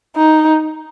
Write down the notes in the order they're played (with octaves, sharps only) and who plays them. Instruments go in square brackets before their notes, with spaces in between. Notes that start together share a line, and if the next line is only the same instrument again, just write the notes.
[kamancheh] D#4